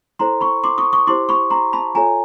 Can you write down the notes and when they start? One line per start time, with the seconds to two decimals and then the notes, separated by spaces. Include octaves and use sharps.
0.19 E4 A4 C5 A#5 C6
0.41 B5 C#6
0.64 C6 D6
0.78 C#6 D#6
0.93 C#6 D#6
1.07 E4 G4 C5 C6 D6
1.29 B5 C#6
1.50 A#5 C6
1.73 A5 B5
1.94 F4 A4 C#5 G#5 A#5